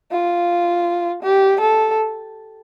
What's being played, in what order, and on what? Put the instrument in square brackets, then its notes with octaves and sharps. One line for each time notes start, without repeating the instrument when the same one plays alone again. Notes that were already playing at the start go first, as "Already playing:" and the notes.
[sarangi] F4
G4
A4